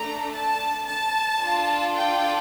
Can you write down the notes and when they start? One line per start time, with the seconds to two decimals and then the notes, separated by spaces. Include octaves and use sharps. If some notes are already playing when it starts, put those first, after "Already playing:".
Already playing: A3 D4 A4 A#5
0.33 A5
0.87 A5
1.41 D4 F4 A4
1.95 G5